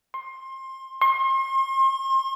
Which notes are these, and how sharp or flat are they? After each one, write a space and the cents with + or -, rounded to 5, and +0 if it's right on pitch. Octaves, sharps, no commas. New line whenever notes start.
C6 +25
C6 +40